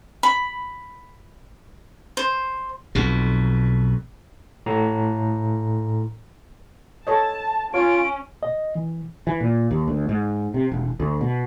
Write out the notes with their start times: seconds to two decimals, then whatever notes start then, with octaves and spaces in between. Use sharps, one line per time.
0.23 B5
2.17 C5
2.95 B1 F2 B2
4.66 A2 A#5
7.07 A4 C#5 D#5 A5
7.74 C#4 F4 C#5 D7
8.43 D#5
8.75 E3
9.27 E3
9.40 A#2
9.71 D#2
9.88 D2
10.09 G#2
10.54 C3
10.72 E1
11.00 D2
11.21 B2